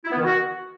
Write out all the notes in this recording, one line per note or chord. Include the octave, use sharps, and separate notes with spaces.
E4
B3
D#3
F#4